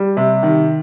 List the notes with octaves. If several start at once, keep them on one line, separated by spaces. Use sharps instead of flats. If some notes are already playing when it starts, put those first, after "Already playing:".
Already playing: G3
C3
D#3